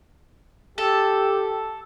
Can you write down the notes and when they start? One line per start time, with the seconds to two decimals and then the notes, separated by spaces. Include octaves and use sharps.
0.78 G4 A4